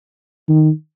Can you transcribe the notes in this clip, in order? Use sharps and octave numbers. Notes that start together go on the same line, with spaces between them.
D#3